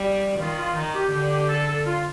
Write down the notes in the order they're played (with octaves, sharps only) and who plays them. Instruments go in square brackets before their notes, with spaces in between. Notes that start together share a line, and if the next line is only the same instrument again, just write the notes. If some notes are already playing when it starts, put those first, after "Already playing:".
Already playing: [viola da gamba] G3
[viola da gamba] D#3 [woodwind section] F4
[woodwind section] F4
[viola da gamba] D#3 [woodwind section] D#4
[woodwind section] G4
[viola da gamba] D3 [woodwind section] G4
[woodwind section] G4
A4
A4
F4